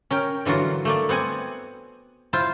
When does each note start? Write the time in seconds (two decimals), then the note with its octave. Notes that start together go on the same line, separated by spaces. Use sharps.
0.11 C#4 A#4 G5
0.45 D3 E3 F#3 F4 F#4
0.85 A3 A#3 D5
1.09 B3 C4 F#5 G#5
2.33 E4 F4 C5